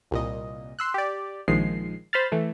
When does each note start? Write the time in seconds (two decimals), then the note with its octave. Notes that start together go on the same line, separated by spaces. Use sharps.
0.11 C2 A#2 D#5
0.79 C6 E6 F#6
0.94 G4 D5
1.48 A#1 D#3 F3 G#3 C7
2.13 C5 B5 F6 A6
2.32 E3 A3